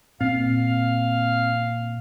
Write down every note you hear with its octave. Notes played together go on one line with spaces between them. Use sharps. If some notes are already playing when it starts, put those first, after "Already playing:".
A#2 C4 F5